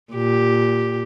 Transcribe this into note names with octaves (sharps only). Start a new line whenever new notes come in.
A#2 G4